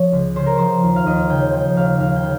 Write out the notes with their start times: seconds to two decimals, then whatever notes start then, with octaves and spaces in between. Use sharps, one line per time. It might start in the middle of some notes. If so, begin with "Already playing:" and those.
Already playing: F3 C#5
0.12 C#2
0.36 C#3 C5
0.46 A#4
0.58 F3 C5
0.83 D#2
0.96 F5
1.06 D#2 D#5
1.30 C#3 G5
1.53 F3 G5
1.76 D#2 F5
2.00 D#2 F5
2.16 G5
2.23 C#3